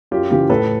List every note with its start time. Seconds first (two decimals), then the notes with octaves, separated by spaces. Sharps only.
0.11 F#2 F4 G4
0.30 C#3 E3 F4 G4
0.50 A2 A4 B4